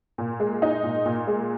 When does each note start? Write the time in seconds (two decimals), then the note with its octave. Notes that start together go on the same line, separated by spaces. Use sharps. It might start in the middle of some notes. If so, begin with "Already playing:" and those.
0.18 A#2
0.40 G#3
0.62 D#4
0.83 A#2
1.06 A#2
1.27 G#3